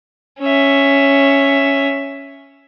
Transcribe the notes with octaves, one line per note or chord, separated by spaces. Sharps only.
C#4 E5